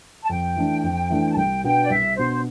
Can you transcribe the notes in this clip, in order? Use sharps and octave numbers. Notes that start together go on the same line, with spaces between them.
A5
F2 G5
E3 A3 D4
F2
E3 A3 D4
A5
C2 G5
B2 B3 D4 G5
D5
C2 E5
B2 B3 D4 C5